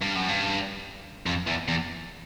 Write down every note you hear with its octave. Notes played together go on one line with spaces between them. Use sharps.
G2
F#2
G2
F2
E2
E2